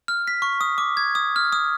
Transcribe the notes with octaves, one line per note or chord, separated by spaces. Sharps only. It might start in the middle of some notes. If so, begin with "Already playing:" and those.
F6
B6
C#6
D#6
D6
G#6
D#6
F6
D#6